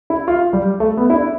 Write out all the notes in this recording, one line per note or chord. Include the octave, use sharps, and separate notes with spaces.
E4
F4
G3
A3
B3
E4
D4